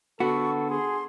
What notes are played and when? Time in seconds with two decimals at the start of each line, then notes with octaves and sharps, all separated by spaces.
0.20 D3 B3 F#4 A4 C#6
0.70 G#4 C6